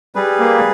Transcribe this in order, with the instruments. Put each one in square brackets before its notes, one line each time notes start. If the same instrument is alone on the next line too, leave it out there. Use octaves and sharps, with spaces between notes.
[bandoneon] G3 [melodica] G#4 B4
[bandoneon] A#3